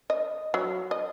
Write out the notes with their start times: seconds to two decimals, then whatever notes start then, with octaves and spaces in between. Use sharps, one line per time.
0.10 D#5
0.54 F#3
0.91 D#5